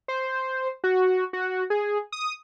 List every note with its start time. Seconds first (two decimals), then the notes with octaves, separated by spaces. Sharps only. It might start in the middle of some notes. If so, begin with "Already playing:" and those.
0.08 C5
0.84 F#4
1.33 F#4
1.70 G#4
2.12 D#6